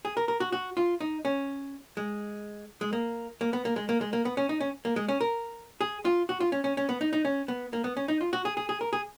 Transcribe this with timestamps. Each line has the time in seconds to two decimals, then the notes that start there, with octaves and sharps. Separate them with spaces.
0.05 G#4
0.17 A#4
0.28 A#4
0.40 F#4
0.52 F#4
0.77 F4
1.00 D#4
1.25 C#4
1.97 G#3
2.81 G#3
2.93 A#3
3.41 A#3
3.53 B3
3.65 A#3
3.76 G#3
3.89 A#3
4.01 G#3
4.13 A#3
4.25 B3
4.37 C#4
4.49 D#4
4.61 C#4
4.85 A#3
4.96 G#3
5.08 C#4
5.21 A#4
5.81 G#4
6.05 F4
6.29 F#4
6.40 F4
6.52 C#4
6.64 C#4
6.77 C#4
6.89 B3
7.01 D#4
7.13 D#4
7.25 C#4
7.48 B3
7.73 A#3
7.84 B3
7.97 C#4
8.08 D#4
8.21 F4
8.33 F#4
8.45 G#4
8.57 G#4
8.69 G#4
8.81 A#4
8.93 G#4